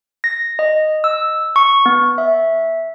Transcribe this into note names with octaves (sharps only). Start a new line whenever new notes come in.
A#6
D#5
E6
C#6
B3
E5